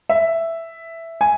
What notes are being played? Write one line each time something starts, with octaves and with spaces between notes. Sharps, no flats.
E5
G#5